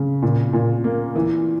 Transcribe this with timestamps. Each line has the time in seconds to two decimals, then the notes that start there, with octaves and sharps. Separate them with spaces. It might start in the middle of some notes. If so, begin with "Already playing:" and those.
Already playing: C#3
0.22 A#2
0.53 A#2
0.84 A#3
1.15 E3